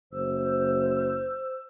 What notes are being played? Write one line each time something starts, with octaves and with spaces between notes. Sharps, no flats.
F#1 C5 E6